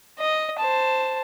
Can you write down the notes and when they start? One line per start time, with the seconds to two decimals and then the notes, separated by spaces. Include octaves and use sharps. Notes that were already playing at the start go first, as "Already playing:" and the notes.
0.19 D#5
0.58 C5 A5